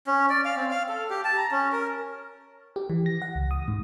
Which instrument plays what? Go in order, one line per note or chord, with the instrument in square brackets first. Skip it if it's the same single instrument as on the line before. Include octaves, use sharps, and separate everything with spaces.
[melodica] C#4
D5
F5
C4
F5
A4
G4
A5
A#5
C#4
A#4
[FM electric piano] G4
E3
A#6
F#5
C#2
D#6
G#2